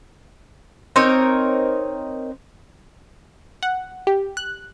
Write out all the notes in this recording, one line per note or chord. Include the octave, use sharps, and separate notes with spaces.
C4 D#4 A#4 C#5
F#5
G4
F#6